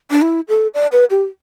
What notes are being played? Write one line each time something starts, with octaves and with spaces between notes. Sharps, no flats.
D4
E4
A4
D5
B4
G4